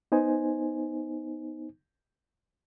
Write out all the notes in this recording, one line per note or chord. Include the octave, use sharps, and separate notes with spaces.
B3 D#4 C5 G#5